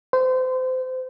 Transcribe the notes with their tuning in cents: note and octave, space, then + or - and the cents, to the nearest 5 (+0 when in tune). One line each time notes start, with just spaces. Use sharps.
C5 -25